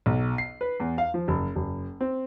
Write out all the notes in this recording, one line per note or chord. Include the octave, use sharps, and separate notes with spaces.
B1
C7
B4
E2
F5
F3
F#1
F#1
C4